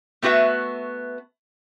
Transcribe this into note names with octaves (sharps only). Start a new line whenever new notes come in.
A3 B3 F#4 B4 E5